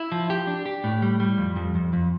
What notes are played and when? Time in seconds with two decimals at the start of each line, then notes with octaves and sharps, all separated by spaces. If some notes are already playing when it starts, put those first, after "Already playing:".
Already playing: E4
0.12 F3
0.30 G4
0.47 D4
0.66 G4
0.84 A2
1.02 G3
1.20 G3
1.38 F2
1.56 F2
1.75 F2
1.93 F2